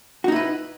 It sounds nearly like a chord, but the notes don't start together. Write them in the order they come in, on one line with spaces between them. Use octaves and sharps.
F#4 D#4 E4 B4